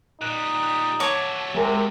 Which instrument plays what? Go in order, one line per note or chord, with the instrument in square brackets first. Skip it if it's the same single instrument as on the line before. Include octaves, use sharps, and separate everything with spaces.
[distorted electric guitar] A#2 G3 [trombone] D#4 [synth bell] F#6
[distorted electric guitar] F#3 A3 [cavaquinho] C#5 D6 [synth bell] A5
[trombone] C3 [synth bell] G#3 A#4